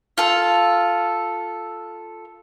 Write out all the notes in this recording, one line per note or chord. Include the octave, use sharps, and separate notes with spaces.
F4 A4